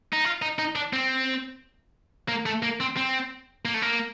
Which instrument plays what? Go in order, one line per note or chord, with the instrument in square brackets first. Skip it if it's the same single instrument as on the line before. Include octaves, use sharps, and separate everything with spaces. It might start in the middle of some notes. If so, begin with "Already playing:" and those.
[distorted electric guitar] D#4
F4
D#4
D#4
D4
C4
A#3
A3
A#3
C4
C4
A#3
A3
A#3